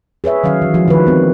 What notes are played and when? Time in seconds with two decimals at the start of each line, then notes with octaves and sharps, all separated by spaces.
0.24 G#4 B4 C#5 E5
0.44 D#3 F#3 C#4 F5
0.62 E3
0.74 F3 G#3 F#4
0.88 D#3 B4
1.07 B3 C4